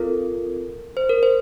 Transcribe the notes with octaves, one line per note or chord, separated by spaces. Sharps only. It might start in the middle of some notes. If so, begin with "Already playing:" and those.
Already playing: C4 F4 A4 A#4
C5
A#4
C5